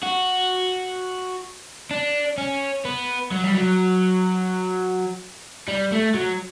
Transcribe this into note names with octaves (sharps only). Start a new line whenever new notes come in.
F#4
D4
C#4
B3
F#3
G3
F#3
G3
A3
F#3